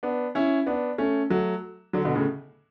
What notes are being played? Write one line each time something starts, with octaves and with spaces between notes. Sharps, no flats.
B3 D4
C#4 E4
B3 D4
A3 C#4
F#3 A3
D3 F#3
B2 D3
A2 C#3